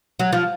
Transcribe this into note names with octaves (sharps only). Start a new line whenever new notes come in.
F#3
F3